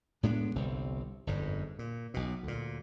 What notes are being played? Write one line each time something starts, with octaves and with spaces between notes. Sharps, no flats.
A2 G#3 B3 D4
G1 C2 C3 C4
G1 F2 G#2
A#2
B1 B2
D2 A#2